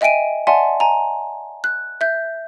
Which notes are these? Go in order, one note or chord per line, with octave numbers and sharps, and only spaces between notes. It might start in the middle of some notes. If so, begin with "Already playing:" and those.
D#5 E5 G5 G#5 D7 D#7
D5 E5 F#5 G#5 A5 C6
G#5 A#5
F#6
E5 G6